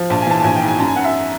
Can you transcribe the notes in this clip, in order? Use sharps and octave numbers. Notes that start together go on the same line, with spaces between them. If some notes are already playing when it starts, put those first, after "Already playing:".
Already playing: F3
A#1 A5
G#5
E3 A5
A5
A#1 G#5
G5
G#2
G#5
F#2 A5
G#5
F#2 F#5
E5